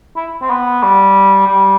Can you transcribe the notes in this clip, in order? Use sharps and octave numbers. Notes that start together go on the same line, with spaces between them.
E4
C4
B3
G3
G3